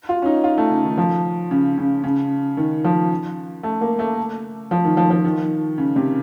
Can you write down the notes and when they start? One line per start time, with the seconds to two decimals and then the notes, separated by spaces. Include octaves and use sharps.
0.09 F4
0.22 C#4
0.26 D#4
0.44 F4
0.58 A3
0.70 C#3
0.84 D#3
0.98 F3
1.51 C#3
1.78 C#3
2.04 C#3
2.57 D#3
2.84 F3
3.63 A3
3.81 A#3
3.99 A3
4.71 F3
4.85 D#3
4.97 F3
5.10 F3
5.25 D#3
5.78 C#3
5.96 C3